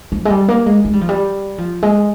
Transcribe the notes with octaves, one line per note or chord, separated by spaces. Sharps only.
F3
G#3
G3
A#3
G#3
G#3
G3
F3
G3
F3
G#3